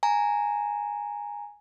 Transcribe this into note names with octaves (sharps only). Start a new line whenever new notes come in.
G#5 A#5